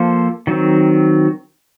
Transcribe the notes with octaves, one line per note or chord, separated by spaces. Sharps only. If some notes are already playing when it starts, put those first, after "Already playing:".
Already playing: F3 A#3 F4 A4 C5
D#3 F#3 C4